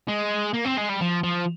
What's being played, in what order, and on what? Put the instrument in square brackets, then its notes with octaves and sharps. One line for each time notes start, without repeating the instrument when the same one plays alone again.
[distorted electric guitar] G#3
A#3
C4
G#3
G3
F3
F3